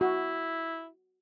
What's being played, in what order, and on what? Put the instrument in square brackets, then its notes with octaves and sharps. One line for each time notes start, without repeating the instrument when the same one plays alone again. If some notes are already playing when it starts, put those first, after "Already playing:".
[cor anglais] E4 [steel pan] F#4